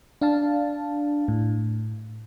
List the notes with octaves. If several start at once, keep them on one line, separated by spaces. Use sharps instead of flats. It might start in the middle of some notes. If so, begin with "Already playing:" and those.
D4 F5 A5
A2